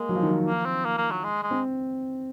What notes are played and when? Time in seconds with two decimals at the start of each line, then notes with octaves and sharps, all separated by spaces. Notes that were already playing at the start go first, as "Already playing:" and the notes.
Already playing: G#3 A#3
0.09 F#3
0.15 F3
0.23 D#3
0.31 F3
0.47 A#3
0.66 C4
0.85 A#3
0.98 A#3
1.11 F#3
1.24 G#3
1.43 G#3
1.51 C4